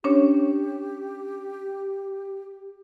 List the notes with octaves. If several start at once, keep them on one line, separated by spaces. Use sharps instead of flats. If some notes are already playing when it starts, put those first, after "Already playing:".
C#4 D4 G4 C#5